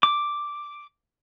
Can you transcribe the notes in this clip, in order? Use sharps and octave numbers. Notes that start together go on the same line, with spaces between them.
D6